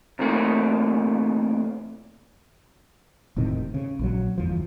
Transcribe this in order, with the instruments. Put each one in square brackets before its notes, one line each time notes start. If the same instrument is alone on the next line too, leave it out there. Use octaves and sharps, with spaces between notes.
[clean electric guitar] C3 E3 A3 A#3
[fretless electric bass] E1 A2 C3 D#3
C#3
A#1 D#3 F#3
G1 E2 F3